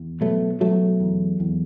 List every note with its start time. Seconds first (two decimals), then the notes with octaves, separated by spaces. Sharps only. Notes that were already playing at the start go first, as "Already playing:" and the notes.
Already playing: E2
0.21 B2 F#3 A3
0.60 B2 F#3 A3
1.00 E2
1.40 E2